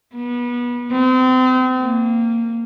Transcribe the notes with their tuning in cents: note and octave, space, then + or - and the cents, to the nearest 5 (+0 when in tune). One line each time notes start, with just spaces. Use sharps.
B3 -30
C4 -35
A#3 -15